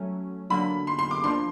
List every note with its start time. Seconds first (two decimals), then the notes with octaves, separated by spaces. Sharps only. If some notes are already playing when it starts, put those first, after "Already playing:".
Already playing: F#3 A3 C#4
0.50 D3 F#3 A#3 B5
0.87 C6
0.99 C6
1.11 D6
1.24 F3 A#3 D4 C6